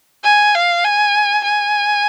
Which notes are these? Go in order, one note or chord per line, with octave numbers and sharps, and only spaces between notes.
G#5
F5
G#5
G#5